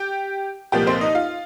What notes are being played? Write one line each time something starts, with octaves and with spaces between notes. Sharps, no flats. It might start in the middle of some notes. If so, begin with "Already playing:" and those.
Already playing: G4 G5
C2 A#2 F3 A#3 G4 G5
C4 C5
D#4 D#5
F4 F5